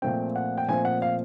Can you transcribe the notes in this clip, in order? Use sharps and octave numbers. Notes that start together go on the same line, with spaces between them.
A#2 F3 A3 C4 G5
F#5
G5
A#2 F3 A3 C4 G#5
F#5
F5